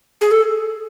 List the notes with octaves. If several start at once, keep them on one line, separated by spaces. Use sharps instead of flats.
G#4
A4